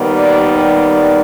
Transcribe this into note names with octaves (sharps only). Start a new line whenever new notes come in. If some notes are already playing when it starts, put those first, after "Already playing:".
Already playing: D#2 D#3 G3 B3
D5
D5